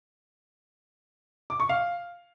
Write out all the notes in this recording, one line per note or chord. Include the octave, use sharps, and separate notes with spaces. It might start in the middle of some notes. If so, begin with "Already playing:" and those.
D6
C#6
F5